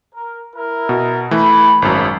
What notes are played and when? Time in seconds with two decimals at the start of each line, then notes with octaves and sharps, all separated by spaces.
0.15 A#4
0.55 E4 A#4
0.89 B2
1.31 E3 A3 B5
1.82 G#1 F#2 D#4 E4 D#6